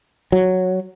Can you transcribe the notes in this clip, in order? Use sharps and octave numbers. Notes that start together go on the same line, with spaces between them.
F#3